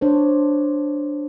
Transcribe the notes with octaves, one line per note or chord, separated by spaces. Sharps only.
D4 C5 C#5